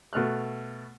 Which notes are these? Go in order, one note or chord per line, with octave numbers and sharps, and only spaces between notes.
B2 A3 F6 F#6